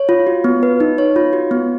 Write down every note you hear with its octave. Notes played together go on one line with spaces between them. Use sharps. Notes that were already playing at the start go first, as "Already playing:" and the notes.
Already playing: C#5
F4
F#4
B3
B4
D#4
C#5
F4
F#4
B3